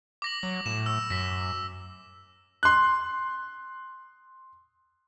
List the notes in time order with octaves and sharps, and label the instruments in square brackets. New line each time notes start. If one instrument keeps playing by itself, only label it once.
[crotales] D6 A#6 F#7
[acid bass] F#3
[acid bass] A2 [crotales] E7
[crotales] E6
[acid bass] F#2 [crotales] A#6 B6
[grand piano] C6 F#6